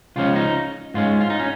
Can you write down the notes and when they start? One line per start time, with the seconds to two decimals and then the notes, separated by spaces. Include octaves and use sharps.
0.16 C#2 C#3 F3 C#4 F4
0.36 D#4
0.94 G#2 G#3 C#4 F4
1.21 F4
1.30 D#4
1.39 C#4